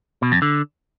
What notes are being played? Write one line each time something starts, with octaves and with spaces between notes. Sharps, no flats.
B2
F2
D3